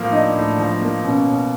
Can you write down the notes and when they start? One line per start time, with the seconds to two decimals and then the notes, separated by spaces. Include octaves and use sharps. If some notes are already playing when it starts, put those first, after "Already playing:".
Already playing: A2 F3 A#3
0.12 D4 D#4
0.35 A2
0.58 F3
0.82 A#3
1.04 B2 C#4
1.27 B2